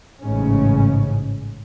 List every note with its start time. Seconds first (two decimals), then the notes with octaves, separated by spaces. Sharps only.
0.21 A1 G#2 C#3 C#4